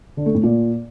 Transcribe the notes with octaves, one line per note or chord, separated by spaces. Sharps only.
D3
A3
A2
A#2